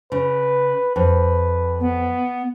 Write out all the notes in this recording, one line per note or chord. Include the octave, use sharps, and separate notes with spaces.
C#3 B4
F2 B4
B3